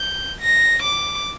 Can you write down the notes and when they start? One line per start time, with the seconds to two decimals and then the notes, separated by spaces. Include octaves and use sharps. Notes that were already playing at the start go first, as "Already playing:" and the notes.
Already playing: G6
0.41 A#6
0.82 D6